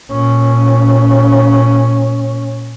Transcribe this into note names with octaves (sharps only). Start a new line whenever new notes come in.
A#2 C#4